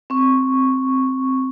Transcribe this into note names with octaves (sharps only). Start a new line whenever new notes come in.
C4 C#6